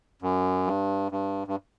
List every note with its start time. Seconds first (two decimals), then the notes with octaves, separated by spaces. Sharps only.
0.22 F#2
0.67 G2
1.12 G2
1.47 G2